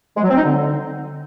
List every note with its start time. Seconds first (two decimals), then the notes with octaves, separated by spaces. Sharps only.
0.17 G#3
0.23 F#3
0.30 C4
0.37 D#4
0.44 D3